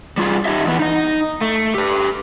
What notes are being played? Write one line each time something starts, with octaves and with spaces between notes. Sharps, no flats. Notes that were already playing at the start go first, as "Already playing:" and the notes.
G3 F4 G#4
D#4 G4 D#5 E5
E2 B3
D#4 D#5
A3
G4 B4